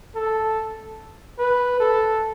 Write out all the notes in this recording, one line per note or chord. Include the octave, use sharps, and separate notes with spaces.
A4
B4
A4